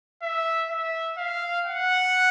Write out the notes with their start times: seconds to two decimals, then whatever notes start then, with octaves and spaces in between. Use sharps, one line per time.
0.22 E5
0.70 E5
1.17 F5
1.65 F#5